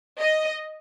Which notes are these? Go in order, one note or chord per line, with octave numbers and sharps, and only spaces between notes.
D#5